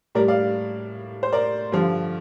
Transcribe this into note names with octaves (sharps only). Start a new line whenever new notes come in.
A2 G3 A#4 D5
D5 F5
C5
A#4 D5
G2 D3 F3